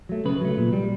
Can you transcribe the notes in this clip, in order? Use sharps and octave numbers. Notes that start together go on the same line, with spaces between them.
F#3 A3
C#3 B4
F#3 A3
A#2
G3